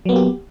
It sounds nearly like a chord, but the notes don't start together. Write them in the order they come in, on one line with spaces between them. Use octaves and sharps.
F#3 B3 A#3 G4